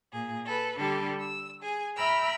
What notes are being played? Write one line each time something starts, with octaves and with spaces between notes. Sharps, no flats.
A#2 G#4
A4 B4
D3 G3 G4 A4
E6
G#4 G#5
E5 G5 A#5 B5 E6 F6